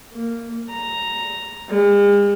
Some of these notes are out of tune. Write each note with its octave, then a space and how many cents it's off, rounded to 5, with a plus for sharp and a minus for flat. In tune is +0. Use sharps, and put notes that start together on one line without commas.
A#3 -10
A#5 +0
G#3 -45